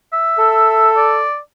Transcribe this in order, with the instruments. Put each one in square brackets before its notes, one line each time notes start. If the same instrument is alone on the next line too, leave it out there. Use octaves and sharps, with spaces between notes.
[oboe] E5
[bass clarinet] A4
[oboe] D5